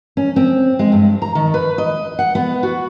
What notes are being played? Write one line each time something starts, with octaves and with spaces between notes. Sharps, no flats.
C#4
C4
G#3
G2
A#5
D#3
B4
D#5
F#5
B3
F#4